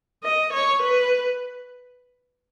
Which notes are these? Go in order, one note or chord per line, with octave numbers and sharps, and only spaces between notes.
D#5
C#5
B4